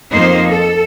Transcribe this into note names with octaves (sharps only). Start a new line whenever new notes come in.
F2 A#3 D#4 C5
A4